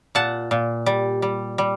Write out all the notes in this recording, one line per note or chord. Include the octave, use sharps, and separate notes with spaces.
A#2 F#5 A5
A#2
G3
G3
G3